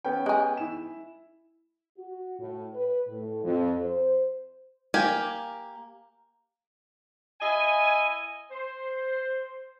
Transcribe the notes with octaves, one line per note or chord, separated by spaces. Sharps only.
B3 C#4 G5
G#3 G#4
E4 E7
F#4
A2
B4
A2
F2
C5
A#3 G4 G#5
E4 D#5 G#5
C5